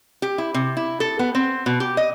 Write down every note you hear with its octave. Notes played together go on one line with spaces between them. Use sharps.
G4
E4
C3
E4
A4
B3
C4
B2
G4
D#5